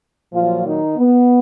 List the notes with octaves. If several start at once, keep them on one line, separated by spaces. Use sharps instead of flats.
A#2 F3 F#3 F4
D#3 D#4
B3